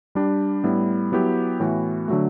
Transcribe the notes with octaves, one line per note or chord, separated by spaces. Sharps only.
G3 D4 G4
A2 G3 B3 E4
F#3 B3 E4 G4
A2 E3 B3 F#4
D3 F#3 A3